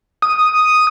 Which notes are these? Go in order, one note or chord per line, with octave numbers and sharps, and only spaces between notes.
D#6